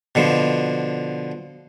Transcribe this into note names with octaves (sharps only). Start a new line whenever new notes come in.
B2 D3 F3